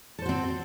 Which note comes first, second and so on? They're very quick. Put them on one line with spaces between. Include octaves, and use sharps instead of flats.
A4 C5 F#4 C4